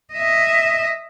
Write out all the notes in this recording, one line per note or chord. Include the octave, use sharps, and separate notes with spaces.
D#5 E5